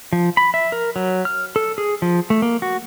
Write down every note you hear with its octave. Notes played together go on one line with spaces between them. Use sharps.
F3
B5
E5
A#4
F#3
F6
A4
G#4
F3
A3
A#3
F#4